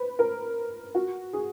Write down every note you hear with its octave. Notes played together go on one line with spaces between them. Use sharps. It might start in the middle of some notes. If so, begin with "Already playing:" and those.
Already playing: B4 C5
A#4
F#4
G#4